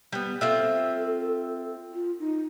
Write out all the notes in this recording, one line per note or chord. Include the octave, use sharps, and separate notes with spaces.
G3 B3
C4 F4 A4 E5
F4
D#4